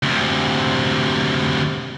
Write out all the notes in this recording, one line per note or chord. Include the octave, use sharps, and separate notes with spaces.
D2 C3